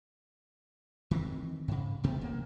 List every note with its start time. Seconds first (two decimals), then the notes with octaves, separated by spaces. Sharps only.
1.11 D#3 E3 G#3 C4
1.68 G#2 C#3
2.04 A1 B2 A3 B3
2.21 D#1 A#3